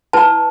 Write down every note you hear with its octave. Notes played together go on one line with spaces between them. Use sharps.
E4 B4 A5